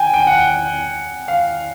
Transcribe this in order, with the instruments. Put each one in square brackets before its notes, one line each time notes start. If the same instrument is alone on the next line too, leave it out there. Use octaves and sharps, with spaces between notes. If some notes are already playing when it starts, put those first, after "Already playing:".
Already playing: [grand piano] G5 G#5
G5
F#5
F5